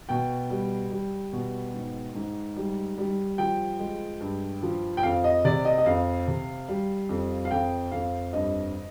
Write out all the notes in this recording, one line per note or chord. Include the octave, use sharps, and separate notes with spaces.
B2 G5
G3
G3
B2
G#2
G#2
G3
G3
F3 G5
G#3
G2
F3
G5
F2 F5
D#5
C3 D5
D#5
D#5
F2 F5
C3
G3
F2
F5
F2 G5
F2 F5
G2 D#5